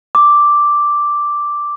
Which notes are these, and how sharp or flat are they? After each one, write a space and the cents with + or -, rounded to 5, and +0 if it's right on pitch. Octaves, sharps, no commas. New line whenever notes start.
D6 +0